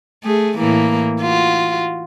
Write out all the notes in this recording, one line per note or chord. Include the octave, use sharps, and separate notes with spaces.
A3 G#4
A2 E3 A#3
F4 F#4